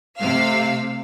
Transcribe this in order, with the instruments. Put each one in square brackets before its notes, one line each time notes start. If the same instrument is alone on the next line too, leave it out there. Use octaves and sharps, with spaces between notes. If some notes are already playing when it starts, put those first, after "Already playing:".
[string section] C3 A3 F5 E6